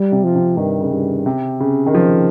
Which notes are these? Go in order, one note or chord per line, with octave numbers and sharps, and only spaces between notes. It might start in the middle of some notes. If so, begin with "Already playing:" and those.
Already playing: G3
C3
F3
C3
G2 D#3
C#3
G2
C3
C#3
D#3
F3